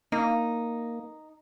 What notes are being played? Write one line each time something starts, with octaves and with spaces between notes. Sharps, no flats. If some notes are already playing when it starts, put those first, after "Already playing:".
A#3 D#4